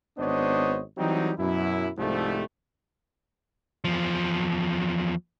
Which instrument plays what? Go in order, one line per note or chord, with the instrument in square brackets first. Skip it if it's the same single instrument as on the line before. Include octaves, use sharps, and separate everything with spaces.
[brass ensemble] G#1 B3 D4 C5 C#5 D#5
E3 F#3 G3 C4 D#4
F#2 B2 E4
C2 G#2 F3 G3 A3
[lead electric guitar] E2 F3